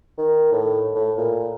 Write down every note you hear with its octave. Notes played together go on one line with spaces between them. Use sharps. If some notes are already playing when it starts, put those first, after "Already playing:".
D#3
A2
A2
A#2